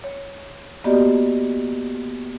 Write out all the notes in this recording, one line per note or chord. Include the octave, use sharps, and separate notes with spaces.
C#5
A#3 B3 F#4 G4 D5 D#5